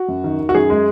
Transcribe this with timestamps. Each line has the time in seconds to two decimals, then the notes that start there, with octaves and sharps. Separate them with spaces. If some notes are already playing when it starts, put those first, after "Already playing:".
Already playing: F#4
0.08 F#2
0.24 D#3
0.39 D#3
0.49 F#4
0.55 F#2 G#4
0.70 G#3